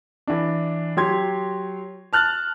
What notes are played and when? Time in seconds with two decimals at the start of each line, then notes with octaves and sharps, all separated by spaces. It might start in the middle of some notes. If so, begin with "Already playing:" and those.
0.27 E3 D4
0.97 F#3 G4 C6 G#6
2.13 A5 F6 F#6 A6